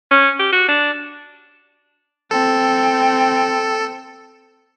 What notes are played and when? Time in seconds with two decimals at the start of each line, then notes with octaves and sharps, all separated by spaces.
0.11 C#4
0.39 G4
0.52 F#4
0.68 D4
2.31 C4 A4 G5